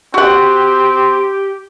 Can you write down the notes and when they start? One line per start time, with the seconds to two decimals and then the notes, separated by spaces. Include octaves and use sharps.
0.14 C4 F#4 G4 F#5